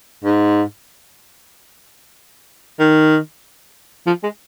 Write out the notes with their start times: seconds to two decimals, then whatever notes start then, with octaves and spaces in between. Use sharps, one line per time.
0.24 G#2
2.80 D#3
4.07 F3
4.23 G#3